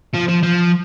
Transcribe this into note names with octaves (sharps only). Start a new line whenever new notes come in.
F3
F3
F3